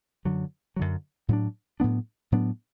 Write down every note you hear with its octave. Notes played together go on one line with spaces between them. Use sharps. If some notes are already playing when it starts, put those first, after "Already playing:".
F#2 D3 F#3
F#2 D3 F#3
A2 F#3 B3 D4
A2 F#3 B3 D4
A2 F#3 B3 D4